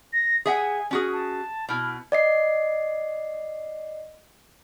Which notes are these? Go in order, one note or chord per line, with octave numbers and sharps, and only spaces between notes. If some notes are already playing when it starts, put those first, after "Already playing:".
A#6
G#4 E5 F#5 G#5
C#4 F#4 G#4
A5
B2 E4 F6
D5 D#5 C7